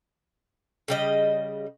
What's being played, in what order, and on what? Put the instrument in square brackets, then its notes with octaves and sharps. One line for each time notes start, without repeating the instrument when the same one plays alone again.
[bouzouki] C#3 G3 D#5